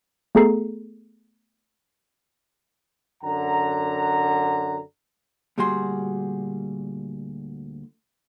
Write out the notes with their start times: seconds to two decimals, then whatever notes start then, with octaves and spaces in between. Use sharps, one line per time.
0.35 A3 B3 G#4 A4 A#5 C7
3.24 F#2 D3 F#5 A#5
5.58 D2 A#2 G3 F#4 G#4 C6